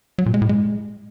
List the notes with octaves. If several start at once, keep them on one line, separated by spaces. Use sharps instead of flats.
F#3
A#2
G#3
A2
G#3